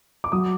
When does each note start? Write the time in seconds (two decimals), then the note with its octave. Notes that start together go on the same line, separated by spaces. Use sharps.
0.24 D6
0.32 F#3 D#6